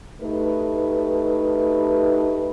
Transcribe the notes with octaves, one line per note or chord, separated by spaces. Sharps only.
D2 A3 D#4 G4 B4